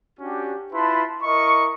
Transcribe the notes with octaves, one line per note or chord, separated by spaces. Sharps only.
C#4 D4 F#4 G4
E4 F4 B4 A5 B5 C6
E4 A#4 D#5 C#6